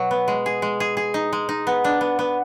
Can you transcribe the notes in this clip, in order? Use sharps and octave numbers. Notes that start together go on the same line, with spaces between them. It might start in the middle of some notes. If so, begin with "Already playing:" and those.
Already playing: B2 F#3
B3
G#3
G#4
G#3
G#4
G#4
D#4
G#3
D#4
B3
D4
B3
B3